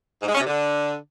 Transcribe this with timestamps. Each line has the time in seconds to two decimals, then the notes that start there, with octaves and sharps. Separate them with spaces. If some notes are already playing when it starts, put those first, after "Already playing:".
0.23 G#2
0.29 G#3
0.35 C#4
0.41 C3
0.47 D3